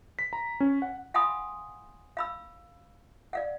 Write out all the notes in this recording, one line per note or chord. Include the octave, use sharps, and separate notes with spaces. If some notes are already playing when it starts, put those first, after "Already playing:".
B6
A#5
C#4
F#5
F5 F#5 G#5 B5 C6 D#6
F5 B5 E6
D5 F5 F#5